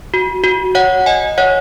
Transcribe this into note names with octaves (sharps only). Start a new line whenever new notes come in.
F#4
F#4
C#5 F#5
D#5 G#5
C#5 F#5